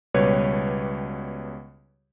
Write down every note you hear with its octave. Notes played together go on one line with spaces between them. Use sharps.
C#2 B2 G3 G4 B4 C#5